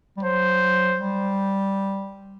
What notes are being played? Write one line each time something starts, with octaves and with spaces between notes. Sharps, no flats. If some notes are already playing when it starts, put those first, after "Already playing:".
G3
F#3 C5
G3